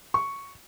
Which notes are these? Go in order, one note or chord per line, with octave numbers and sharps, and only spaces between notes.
C#6